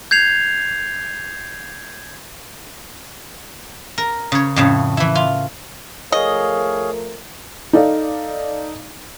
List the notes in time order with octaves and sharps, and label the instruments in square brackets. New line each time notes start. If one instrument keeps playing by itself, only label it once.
[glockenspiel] G6 G#6 C7 F7
[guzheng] A#4
C#3 C#5
F2 A2 C#3
E3 E4
F4
[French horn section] F3 A3 A#4 [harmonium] G#4 C#5 F5 [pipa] D#5
[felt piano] D#4 A4 D5 F5